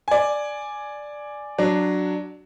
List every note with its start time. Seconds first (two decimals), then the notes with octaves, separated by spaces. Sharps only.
0.08 D5 G#5
1.58 F#3 D4